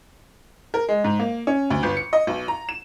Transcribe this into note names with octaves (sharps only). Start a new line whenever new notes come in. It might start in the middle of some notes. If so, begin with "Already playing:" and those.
A#4
G#3
G#2
A#3
C#4
D2
G1
C#7
D#5
B1
A#5
E7